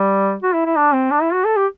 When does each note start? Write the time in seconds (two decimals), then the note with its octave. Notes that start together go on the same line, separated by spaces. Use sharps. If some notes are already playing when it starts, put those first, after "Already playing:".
Already playing: G3
0.43 F#4
0.54 E4
0.65 E4
0.76 D4
0.93 C4
1.11 D4
1.22 E4
1.33 F#4
1.45 A4
1.56 G4